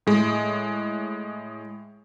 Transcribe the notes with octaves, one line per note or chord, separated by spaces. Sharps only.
A2 G#3